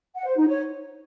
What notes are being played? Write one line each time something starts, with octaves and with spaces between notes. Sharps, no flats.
F#5
C5
D#4
C#5